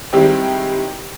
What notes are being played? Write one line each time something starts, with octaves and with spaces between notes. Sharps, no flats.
D#3 G3 G#3 C4 E4 G4